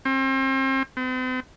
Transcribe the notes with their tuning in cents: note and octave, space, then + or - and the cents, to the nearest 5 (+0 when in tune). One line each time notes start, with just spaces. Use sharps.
C4 +35
C4 -45